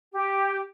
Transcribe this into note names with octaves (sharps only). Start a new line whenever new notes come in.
G4